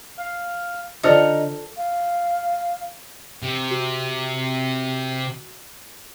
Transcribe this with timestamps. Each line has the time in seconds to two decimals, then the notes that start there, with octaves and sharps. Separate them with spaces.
0.17 F5
1.03 D3 D#4 F4 A4 C5 D5 F6 C#7
1.77 F5
3.43 C3
3.71 F#4